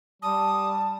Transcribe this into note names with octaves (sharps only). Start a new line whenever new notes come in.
G3 A5 D#6